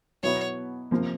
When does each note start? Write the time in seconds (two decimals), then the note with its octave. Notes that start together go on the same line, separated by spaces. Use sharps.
0.23 B2 F#3 B3 E4 C#5
0.91 C3 F3 A#3